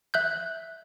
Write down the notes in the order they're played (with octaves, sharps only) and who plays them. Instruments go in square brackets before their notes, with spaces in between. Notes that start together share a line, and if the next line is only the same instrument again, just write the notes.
[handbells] E5 F#6 G6